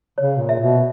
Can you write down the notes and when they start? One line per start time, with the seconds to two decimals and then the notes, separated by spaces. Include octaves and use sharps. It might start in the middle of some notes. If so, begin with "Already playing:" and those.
0.18 C#3 C#5
0.38 A#2
0.49 E5
0.60 B2